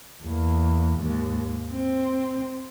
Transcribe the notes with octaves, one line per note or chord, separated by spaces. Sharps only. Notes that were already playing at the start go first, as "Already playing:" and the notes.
E2 A#3
D#2 G#2
C4